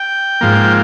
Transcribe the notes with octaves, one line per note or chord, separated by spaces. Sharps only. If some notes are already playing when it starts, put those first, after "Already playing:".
Already playing: G5
G#2 F3 A#3